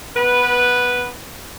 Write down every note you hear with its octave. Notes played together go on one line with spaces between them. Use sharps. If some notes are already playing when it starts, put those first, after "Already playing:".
B3 B4